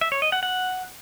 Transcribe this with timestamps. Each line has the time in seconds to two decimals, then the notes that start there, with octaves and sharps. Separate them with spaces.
0.01 E5
0.12 C#5
0.22 D#5
0.32 F#5
0.43 F#5